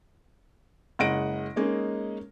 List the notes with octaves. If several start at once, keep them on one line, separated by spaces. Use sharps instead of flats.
F#1 G#3 D#5 F#5 A#6 D7
G#3 A#3 C#4 D#4